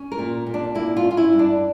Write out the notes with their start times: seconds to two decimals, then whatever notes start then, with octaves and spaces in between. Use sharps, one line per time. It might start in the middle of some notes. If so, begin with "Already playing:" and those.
Already playing: C#4
0.12 A#4
0.19 A#2
0.47 A#2
0.54 D4
0.75 A#3 E4
0.97 F4
1.04 C#4
1.11 F4
1.17 E4
1.32 G2
1.39 D4